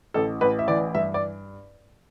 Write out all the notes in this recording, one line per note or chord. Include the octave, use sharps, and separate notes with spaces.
A1 A4
A1 B4
E5
E3 D5
G2 E5
D5